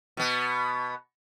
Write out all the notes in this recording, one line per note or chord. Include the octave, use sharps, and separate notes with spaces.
B2 B3